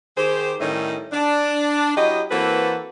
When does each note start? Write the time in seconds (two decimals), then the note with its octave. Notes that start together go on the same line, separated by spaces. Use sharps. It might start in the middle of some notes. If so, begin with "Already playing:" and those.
0.17 D#3 G4 G#4 C5
0.60 A2 D#3 G3 C#4 D#4 E5
1.12 D4
1.97 F#3 E4 G4 D#5
2.31 E3 A#3 C4 F#4 A4 B4